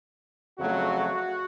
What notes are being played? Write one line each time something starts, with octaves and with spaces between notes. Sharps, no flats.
F2 C#3 F#3 A3 F#4